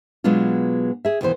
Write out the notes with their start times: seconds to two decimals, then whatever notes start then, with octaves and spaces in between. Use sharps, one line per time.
0.24 B2 F#3 G#3 B3 D4 F4
1.05 G#4 E5
1.21 D#2 B2 E3 C5